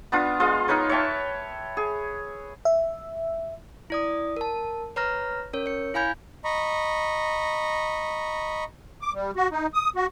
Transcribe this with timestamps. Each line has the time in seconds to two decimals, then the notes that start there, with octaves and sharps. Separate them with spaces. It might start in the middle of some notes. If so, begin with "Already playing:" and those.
0.12 B3 D4 F4 D#6
0.40 G#3 F4 D#5 F5
0.68 D#4 A#4 B4 C#5
0.89 C#5 E5 G5 A5
1.77 G#4
2.65 E5
3.90 E4 D5 D#6
4.37 A#4 A5
4.96 B4 C#5 A#5 F6 A#6
5.53 C#4 A#4 C#5
5.66 C#5 C#7
5.94 E4 F5 G#5 B5 G6 G#6
6.44 D#5 A#5 B5 C#6
9.01 D6
9.15 G3
9.36 F#4
9.51 D#4
9.74 D#6
9.96 F#4